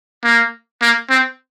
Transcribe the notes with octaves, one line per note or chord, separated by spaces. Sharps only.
A#3
A#3
C4